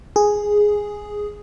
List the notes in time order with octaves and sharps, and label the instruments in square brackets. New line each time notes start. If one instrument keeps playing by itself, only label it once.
[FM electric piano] G#4